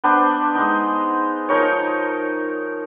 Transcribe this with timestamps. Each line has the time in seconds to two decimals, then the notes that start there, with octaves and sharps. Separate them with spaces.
0.04 B3 D4 B4 C5
0.55 G#3 D#4
1.49 F3 D#4 A#4 C#5